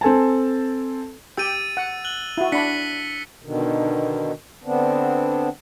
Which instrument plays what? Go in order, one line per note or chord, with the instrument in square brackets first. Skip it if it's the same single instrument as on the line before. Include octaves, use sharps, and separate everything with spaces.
[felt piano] C4 A4 G#5 A5
[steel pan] G4 G5 [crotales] E6 A6 D#7
[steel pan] F#5
[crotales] F#6 F#7 G7
[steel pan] E4 F#4
[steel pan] D4 B5 [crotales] B6 C#7
[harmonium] B2 D3 D#3
D3 B3 C4 D4